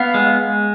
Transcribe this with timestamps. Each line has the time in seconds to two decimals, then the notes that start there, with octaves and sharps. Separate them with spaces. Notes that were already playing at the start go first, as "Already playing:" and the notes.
Already playing: B3 F5
0.14 G#3